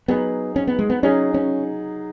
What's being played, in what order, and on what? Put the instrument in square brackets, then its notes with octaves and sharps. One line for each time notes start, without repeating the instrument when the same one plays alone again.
[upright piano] F#3 D#4 G#4 [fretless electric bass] B3
[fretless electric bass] C#4
B3
G#3
B3
[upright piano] F#3 D#4 G#4 [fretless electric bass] C#4
[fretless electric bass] C#4